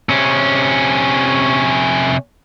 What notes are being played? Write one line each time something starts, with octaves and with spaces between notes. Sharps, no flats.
C3 C#4